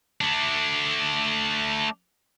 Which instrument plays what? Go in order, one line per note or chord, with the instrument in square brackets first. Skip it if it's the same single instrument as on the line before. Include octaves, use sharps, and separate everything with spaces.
[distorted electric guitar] A3 D4